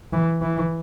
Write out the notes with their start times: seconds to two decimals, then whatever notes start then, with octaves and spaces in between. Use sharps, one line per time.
0.13 E3
0.42 E3